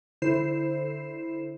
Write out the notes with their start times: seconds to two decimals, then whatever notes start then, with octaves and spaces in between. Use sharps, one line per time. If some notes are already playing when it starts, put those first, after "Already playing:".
0.22 D3 E4 C5 C7 E7